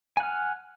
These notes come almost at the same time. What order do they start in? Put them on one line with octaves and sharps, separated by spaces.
G#5 F#5 F6